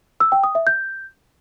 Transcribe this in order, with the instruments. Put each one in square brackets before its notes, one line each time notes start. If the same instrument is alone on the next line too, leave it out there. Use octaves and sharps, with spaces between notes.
[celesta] E6
G5
D#6
E5
G6